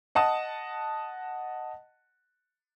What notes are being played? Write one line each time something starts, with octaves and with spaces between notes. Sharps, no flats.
D#5 F#5 A5 D#6